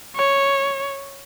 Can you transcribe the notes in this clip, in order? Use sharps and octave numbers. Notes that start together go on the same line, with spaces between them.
C#5